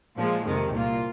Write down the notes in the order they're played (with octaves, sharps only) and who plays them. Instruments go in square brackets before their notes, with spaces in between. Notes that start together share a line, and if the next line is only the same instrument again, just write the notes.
[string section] A#2 F3 G#3
F2 C3 D#3 G#3
C2 A#2 A#3 F4